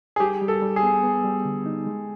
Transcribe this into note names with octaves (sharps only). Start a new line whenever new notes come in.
G#4
G3 G4
G3
A4
G3
G#4
B3
B3
G3
D3
D#4
G#3